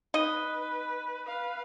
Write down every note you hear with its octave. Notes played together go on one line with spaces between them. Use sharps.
D#4 B4 D#5
B4 F5